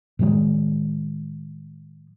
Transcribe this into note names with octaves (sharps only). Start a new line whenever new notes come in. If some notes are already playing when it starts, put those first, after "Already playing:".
A2 D#3 F#3 G#3